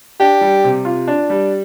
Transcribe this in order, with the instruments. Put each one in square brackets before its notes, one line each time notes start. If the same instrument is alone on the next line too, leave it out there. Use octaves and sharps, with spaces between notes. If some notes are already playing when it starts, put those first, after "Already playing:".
[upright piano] D4 [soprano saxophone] G4
[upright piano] G3
C3
F4
D4
G3